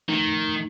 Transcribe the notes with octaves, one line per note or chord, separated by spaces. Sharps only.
D#3 F3 A3 D#4